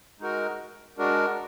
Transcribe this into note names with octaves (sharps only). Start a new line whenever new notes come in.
G#3 D#4 F#4 A#4
G#3 D4 F#4 A#4